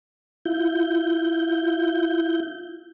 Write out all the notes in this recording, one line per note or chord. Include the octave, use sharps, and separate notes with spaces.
E4 F4 G6